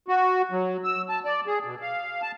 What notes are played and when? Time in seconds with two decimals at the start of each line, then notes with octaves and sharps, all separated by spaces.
0.08 F#4
0.51 F#3
0.84 E6
1.09 A5
1.25 D5
1.47 G#4
1.64 B2
1.81 F5
2.22 A5